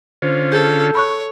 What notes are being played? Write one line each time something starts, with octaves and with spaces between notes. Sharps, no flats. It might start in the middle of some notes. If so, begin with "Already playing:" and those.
D3 C#4 F4 C5
G#4 A4 G6
C#5 B5 C#6 F#6